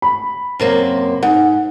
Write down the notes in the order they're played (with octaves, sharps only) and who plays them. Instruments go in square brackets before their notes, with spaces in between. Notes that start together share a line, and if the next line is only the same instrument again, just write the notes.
[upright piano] B5
[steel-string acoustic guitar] F#2 C3 A#3
[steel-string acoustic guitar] G#2 [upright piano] F#5